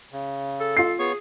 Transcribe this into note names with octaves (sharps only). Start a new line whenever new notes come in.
C#3
A4
F4 C7
B3 G#4 C#5 C#6